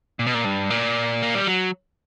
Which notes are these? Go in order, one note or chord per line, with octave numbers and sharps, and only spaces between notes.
A#2
B2
A#2
G2
A#2
A#3
G3
F#3